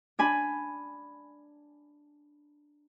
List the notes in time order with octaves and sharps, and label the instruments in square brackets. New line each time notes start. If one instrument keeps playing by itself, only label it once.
[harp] D4 G#5 B5